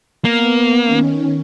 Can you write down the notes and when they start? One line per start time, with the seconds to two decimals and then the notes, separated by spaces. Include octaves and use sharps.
0.25 A#3 B3
0.83 D#3 C#4